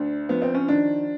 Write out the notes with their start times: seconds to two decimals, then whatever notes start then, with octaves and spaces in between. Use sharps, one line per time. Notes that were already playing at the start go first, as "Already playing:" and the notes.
Already playing: D2 D4
0.29 F3 B3
0.42 C4
0.55 C#4
0.68 D#3 D4